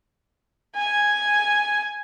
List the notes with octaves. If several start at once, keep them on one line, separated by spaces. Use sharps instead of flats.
G#5